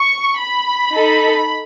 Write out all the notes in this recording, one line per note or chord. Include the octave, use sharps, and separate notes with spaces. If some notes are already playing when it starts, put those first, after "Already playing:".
Already playing: C#6
B5
D#4 A4